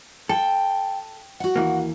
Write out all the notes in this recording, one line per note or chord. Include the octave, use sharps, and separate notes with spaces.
A4 G5
F#4 F#5
D#2 E3 A#3